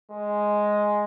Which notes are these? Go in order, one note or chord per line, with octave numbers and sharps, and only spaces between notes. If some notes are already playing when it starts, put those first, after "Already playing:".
G#3